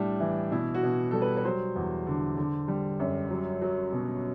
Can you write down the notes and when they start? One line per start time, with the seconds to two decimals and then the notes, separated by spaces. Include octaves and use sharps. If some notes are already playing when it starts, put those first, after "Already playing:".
Already playing: A2 G3 D4
0.20 E3
0.51 B2 E4
0.74 F#4
0.83 B2
1.11 G3 A4
1.22 B4
1.37 B4
1.45 F#3 C5
1.76 E2
2.07 D3
2.37 D3
2.68 G3
3.00 F#2
3.31 F#3
3.62 F#3
3.92 B2